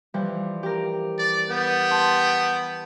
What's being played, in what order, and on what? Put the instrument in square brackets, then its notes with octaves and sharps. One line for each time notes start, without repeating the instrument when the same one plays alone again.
[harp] E3 F3 G3
G4 A#4
[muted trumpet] D5
[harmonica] B3 [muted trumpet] G5
[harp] A5 C6